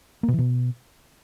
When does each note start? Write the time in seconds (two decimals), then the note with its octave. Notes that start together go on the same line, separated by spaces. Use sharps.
0.23 A#3
0.28 B2
0.33 E3
0.38 B2